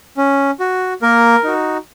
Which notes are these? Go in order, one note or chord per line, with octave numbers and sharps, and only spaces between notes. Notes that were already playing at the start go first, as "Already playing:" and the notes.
C#4
F#4
A#3 A#4
D#4 F#4